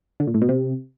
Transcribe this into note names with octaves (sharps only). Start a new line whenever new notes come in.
D3
A#2
A2
B2
C3